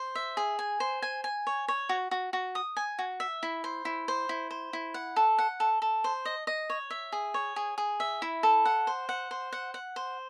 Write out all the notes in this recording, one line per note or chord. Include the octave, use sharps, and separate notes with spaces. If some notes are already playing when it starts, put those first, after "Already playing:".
Already playing: C5
E5
G#4
G#5
C5
G#5
G#5
C#5
C#5
F#4
F#4
F#4
D#6
G#5
F#4
E5
E4
C5
E4
C5
E4
C5
E4
F#5
A4
F#5
A4
A4
C5
D#5
D#5
C#5
E5
G#4
C#5
G#4
G#4
E5
E4
A4
F#5
C5
F#5
C5
F#5
F#5
C5